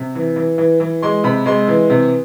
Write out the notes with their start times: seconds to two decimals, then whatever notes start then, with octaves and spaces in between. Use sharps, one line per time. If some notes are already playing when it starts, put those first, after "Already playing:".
Already playing: C3
0.15 E3
0.36 E3
0.58 E3
0.80 E3
1.02 G#3 C6
1.24 C3 B5
1.46 G#3 C6
1.68 E3
1.90 C3